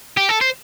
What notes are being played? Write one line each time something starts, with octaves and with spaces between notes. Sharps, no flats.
G4
A4
C5